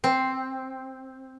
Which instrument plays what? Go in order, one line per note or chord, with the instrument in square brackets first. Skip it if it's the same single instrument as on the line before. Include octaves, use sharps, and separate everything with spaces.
[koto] C4